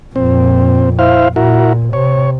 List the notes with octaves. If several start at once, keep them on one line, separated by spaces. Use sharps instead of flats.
F2 A#2 C4
E4 C5 F5
A#2 E4 F#4 A#4
C3 C#5